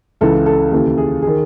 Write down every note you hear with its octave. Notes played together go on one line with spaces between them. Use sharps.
C#2 C#3 E3 A4
A4
D#2 C#3 E3 A4
G#4
D#3 G#4